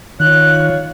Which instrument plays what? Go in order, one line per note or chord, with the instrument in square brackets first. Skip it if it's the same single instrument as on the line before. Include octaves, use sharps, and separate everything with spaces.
[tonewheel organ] D#3 [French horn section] F4 C#5 [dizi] F#6